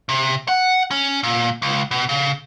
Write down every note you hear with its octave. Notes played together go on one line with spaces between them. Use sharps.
C3
F#5
C#4
A#2
C#2
B2
C#3